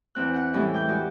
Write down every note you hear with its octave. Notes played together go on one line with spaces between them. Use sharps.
E2 C4 F#6
F#5 F#6
A2 E3 G3 G#3 C#4 E4
G5 D6 G6
G#3 F#4 D5